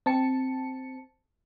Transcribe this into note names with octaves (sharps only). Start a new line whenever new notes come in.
C4 A5 C#7